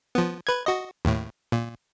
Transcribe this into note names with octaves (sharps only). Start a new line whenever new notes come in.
F3 B3
B4 G#6
F#4 D#5
D#2 A2
A#2